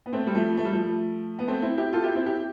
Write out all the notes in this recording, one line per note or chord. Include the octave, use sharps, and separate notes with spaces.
B3
A3 C4
G3
F3 A3
A3
G3
F3 A3
B3
A3 C4
C4 E4
E4 G4
F4 A4
E4 G4
C4 E4
E4 G4